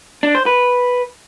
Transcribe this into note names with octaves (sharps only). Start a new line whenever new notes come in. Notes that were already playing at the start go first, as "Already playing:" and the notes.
D4
C5
B4